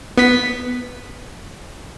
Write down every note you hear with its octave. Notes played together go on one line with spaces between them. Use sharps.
B3 B6